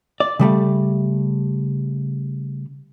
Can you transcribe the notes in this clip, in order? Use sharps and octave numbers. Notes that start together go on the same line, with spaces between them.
D5
C#3 G3 A3